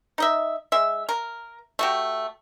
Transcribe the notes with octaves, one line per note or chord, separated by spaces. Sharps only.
D#4 D#5 E5
G#3 E5
A#4
A3 F#4 G4